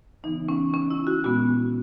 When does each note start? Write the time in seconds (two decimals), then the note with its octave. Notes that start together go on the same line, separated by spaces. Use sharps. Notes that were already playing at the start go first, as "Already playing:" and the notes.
0.23 C#3 E3 B3 D#4
0.49 C#4
0.74 C#4
0.91 E4
1.07 F#4
1.24 A#2 G#3 B3 F#4